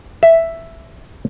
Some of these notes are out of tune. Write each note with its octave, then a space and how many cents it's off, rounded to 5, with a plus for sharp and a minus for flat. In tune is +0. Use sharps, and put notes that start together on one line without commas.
E5 +5